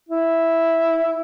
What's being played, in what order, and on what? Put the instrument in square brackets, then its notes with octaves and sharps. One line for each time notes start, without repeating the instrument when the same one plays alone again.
[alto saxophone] E4